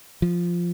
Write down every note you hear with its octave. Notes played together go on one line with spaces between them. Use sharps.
F3